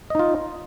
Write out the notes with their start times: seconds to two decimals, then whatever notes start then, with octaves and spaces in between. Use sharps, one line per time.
0.10 D#5
0.15 D#4
0.19 F4